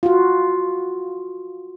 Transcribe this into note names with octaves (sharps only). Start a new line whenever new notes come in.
F4 F#4